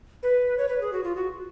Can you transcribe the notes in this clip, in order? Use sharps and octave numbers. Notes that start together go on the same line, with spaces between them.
B4
C#5
B4
G#4
F#4
F4
F#4